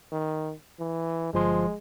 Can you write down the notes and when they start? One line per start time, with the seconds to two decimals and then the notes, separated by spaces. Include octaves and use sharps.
0.12 D#3
0.79 E3
1.34 G1 F3 G#3 C6